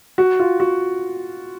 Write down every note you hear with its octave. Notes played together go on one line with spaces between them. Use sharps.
F#4
F4
F#4